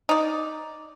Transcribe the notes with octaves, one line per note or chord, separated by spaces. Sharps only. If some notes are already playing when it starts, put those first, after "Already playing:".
D#4 D5